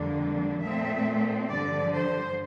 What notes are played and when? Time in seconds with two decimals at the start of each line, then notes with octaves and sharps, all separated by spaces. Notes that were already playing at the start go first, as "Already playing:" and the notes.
Already playing: F2 D3 G3 A#3 D4
0.61 A#2 A3 C4 E5
1.49 G2 D3 F3 D5
1.94 C5